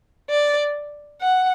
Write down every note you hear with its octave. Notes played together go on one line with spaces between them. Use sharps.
D5
F#5